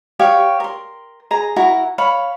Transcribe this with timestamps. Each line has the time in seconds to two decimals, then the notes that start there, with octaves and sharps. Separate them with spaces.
0.19 G4 C#5 F5 C#6
0.60 A#4 C6
1.31 G#4 G#5 A#5
1.56 E4 F#4 A#4 A#5
1.98 C#5 F5 B5